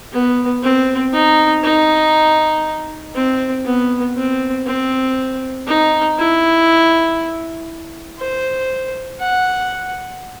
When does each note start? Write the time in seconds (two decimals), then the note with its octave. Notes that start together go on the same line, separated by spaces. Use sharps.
0.12 B3
0.63 C4
1.13 D#4
1.63 D#4
3.15 C4
3.65 B3
4.16 C4
4.66 C4
5.67 D#4
6.18 E4
8.19 C5
9.20 F#5